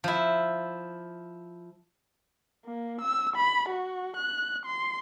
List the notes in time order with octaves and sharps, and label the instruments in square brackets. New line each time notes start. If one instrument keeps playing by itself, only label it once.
[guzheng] F3 E4
[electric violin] A#3
E6
B5
F#4
F#6
C6